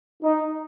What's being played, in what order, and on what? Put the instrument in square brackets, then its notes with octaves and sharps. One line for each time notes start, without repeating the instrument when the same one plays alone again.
[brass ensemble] D#4